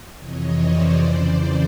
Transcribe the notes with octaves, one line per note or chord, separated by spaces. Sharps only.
F2 C3 E3 C#5 D#5
C5 D5
F2 C#3 E3